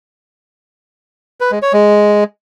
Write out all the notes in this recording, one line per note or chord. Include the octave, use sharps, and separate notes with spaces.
B4
G#3
C#5
G#3